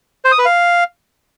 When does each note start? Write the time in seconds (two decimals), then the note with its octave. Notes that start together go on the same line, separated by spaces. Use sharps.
0.25 C5
0.32 D#6
0.39 B4
0.45 F5